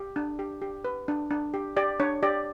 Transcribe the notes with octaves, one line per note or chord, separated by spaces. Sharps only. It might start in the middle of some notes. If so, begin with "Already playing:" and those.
Already playing: G4
D4
G4
G4
B4
D4
D4
G4
G4 D5
D4 C#5
G4 D5